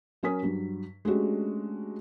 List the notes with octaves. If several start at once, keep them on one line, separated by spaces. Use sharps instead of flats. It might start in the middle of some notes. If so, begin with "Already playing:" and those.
F#3 C#4 A#4 G#5 D#6 B6
G2 F#3
G#3 A3 C#4 D4 F#4 G4